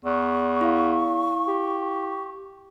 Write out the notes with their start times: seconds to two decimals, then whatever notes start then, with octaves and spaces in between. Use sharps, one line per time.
0.05 E2 C#6
0.61 E4 F5
1.48 G4